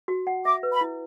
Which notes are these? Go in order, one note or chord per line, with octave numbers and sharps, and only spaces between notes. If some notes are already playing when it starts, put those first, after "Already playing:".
F#4
F#5
E5 D6
B4
B5
E4